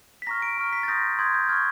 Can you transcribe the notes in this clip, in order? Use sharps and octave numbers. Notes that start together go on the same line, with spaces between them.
B6
A#5 C#6 F6 A#6
D7
A#5 C#6 F6
B6
A6
C6 D#6 G6 A#6
C6 D#6 G6 G#6
G6
C#6 F6 G#6